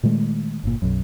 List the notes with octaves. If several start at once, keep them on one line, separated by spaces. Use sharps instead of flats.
A#2 D#3 G#3 A3
G1 A#2
B1 F#2